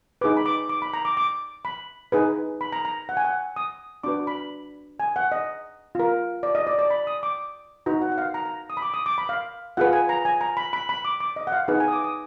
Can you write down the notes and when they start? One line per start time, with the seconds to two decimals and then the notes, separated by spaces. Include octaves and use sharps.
0.21 D#4 G#4 B4 D6
0.37 B5
0.46 D6
0.69 D6
0.82 B5
0.93 A#5
1.05 D6
1.17 D6
1.65 B5
2.12 D#4 G#4 B4
2.61 B5
2.72 A#5
2.85 A#5
3.09 F#5
3.17 G#5
3.24 F#5
3.56 D#6
4.03 D4 F#4 B4 D6
4.27 B5
5.00 G#5
5.16 F#5
5.32 D#5
5.95 F4 A#4
6.43 D5
6.55 D#5
6.67 D5
6.79 D5
6.90 B5
7.07 D#6
7.23 D6
7.86 D#4 F#4 B4 A#5
8.02 F#5
8.12 F#5
8.18 F5
8.34 A#5
8.46 A#5
8.70 D#6
8.77 B5
8.82 D6
8.94 D#6
9.06 D6
9.18 B5
9.29 F5
9.77 F4 G#4 B4 F#5
9.93 G#5
10.09 A#5
10.25 G#5
10.41 A#5
10.57 B5
10.73 B5
10.89 B5
11.05 D6
11.20 D6
11.36 D#5
11.47 F#5
11.52 F5
11.68 D#4 G#4 B4 F#5
11.80 G#5
11.88 D#6
11.93 D6
12.04 D#6